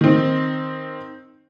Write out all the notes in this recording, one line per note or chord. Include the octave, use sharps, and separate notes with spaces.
D#3 C4